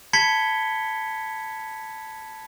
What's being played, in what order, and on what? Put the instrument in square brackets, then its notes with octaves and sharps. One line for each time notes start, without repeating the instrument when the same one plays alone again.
[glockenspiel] A5 B5 G#6 B6 C#7 G7